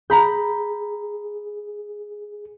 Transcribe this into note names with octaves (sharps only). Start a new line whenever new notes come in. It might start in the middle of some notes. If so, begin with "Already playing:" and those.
G#4 A#5 B5 G6